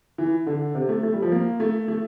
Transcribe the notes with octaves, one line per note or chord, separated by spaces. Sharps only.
E3
D3
C3
A3
A3
G3
F3
A#3
A3
A3